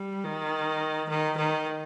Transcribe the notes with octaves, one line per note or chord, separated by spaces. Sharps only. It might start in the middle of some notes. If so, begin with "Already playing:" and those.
Already playing: G3
D#3
D#3
D#3